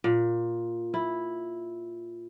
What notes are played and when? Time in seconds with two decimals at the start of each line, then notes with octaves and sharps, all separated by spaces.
0.04 A#2
0.94 E4